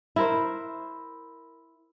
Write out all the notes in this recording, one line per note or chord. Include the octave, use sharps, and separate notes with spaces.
E4 A#4 C5